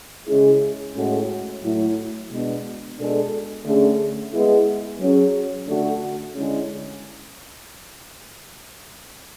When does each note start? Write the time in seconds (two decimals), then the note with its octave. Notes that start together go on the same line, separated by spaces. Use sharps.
0.28 C#3 G#3 C#4 E4 G#4
0.95 A2 G#3 C#4 F#4 A4
1.63 A2 F#3 A3 E4
2.30 B2 G#3 B3 D4
2.97 B2 G#3 D4 A4
3.65 D3 A3 C#4 G#4
4.33 G#3 B3 E4 G#4
4.99 F#3 C#4 G#4
5.67 D3 A3 D4 F#4 A4
6.35 D3 G#3 C#4 E4 G#4